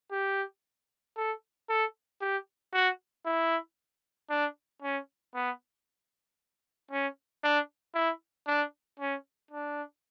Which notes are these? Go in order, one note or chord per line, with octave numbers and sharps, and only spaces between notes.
G4
A4
A4
G4
F#4
E4
D4
C#4
B3
C#4
D4
E4
D4
C#4
D4